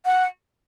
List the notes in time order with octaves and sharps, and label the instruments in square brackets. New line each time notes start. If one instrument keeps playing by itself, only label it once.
[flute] F#5